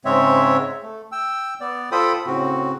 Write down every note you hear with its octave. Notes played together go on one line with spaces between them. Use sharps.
G#2 C#3 G#3 C4 C#5 E5
A3
G5 E6
B3 D5
F4 A4 C5 G5 B5 D#6
A2 C#3 C4 F#4